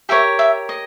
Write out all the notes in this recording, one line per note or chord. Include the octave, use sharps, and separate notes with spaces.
G4 A#4 C#5 E5
E5
D#5